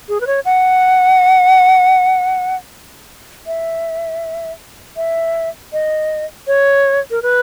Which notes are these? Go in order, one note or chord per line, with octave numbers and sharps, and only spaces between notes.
G#4
B4
C#5
F#5
E5
E5
D#5
C#5
A#4
B4